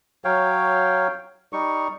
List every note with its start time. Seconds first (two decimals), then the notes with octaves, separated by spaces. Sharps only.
0.25 F#3 C#5 F5 G5
1.53 G3 D#4 C#6